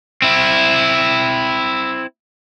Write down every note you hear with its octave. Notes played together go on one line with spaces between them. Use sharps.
C4 E4